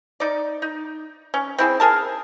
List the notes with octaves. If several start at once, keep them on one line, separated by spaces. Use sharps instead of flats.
D#4 D5
D#4
C#4
C4 E4 G#4
G#4 A#4 A5